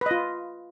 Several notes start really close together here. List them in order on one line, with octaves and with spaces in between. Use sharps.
B4 D#5 F4